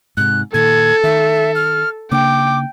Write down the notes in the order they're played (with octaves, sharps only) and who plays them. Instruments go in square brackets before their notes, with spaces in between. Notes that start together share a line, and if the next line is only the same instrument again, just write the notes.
[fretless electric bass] G#2 C3 [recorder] F#6
[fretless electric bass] A#2 D#3 [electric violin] A4 [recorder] G#6
[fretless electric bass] D#3 [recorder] E5
[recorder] F6
[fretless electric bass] C#3 A#3 D4 [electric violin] G5 [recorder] D6